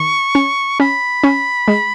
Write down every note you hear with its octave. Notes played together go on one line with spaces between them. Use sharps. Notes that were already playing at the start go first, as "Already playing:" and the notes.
Already playing: D#3 C#6
C#4
C#4 B5
C#4
G#3